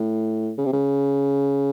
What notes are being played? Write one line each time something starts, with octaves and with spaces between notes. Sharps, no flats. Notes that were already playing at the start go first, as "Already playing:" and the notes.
Already playing: A2
C#3
C3
C#3